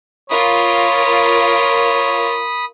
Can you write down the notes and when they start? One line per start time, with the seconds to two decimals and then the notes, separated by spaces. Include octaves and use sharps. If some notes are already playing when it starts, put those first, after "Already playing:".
0.30 F4 A#4 C#5 B5 D#6